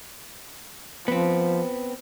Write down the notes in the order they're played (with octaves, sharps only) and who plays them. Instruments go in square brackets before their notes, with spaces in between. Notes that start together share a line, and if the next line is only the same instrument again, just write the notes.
[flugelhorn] F3 [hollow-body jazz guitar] B3 C4